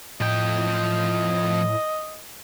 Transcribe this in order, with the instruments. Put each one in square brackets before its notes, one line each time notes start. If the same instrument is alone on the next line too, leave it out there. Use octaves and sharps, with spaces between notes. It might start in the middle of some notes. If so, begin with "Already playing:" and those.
[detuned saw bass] A2 [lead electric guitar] F3 G5 [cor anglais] D#5